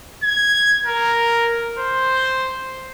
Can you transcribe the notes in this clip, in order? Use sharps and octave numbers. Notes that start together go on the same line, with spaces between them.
G#6
A#4
C5